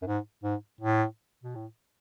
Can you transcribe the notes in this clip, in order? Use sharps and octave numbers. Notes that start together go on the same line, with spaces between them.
F#2
G#2
G#2
A2
B2
A2